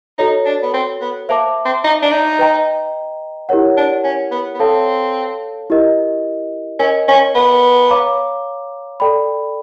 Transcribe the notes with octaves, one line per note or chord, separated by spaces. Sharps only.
D#4 F#4 A4 C#5
D4
B3
C4
B3
A#3 C5 E5 A5 D6
C4
D#4
D4
D#4
B4 D#5 G5 A#5
E4 G4 A#4 C#5 F#5
D4
C#4
B3
B3
C4 A4 C#5 F5 A5
E4 G4 A#4 D#5
C#4 A#4 D#5 G#5
C#4
B3
C#5 F5 A#5 D6
A4 D5 G5 B5